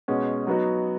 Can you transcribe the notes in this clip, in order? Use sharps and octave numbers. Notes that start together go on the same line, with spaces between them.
B2 G#3 C#4
F#3 B3 D#4 F#4